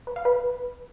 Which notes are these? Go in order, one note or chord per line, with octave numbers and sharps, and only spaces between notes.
B4
F5
B4